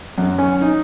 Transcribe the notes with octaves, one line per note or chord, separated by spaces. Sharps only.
F#2
C#4
D#4